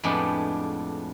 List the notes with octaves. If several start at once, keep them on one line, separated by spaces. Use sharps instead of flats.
F2 A2 G#3 B3 D4 G4